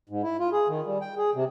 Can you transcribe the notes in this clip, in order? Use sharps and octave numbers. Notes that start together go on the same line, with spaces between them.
G#2
E4
F4
G#4
D#3
G3
G5
G#4
C3